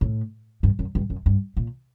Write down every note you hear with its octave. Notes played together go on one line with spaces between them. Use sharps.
A2
G2
F#2
G2
F#2
G2
A#2